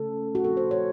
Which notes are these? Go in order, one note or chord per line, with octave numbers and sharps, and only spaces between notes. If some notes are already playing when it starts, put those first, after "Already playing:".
Already playing: C#3 A3 C#4 A4
F#4
A#2 F3 C4 A4
C5
C#5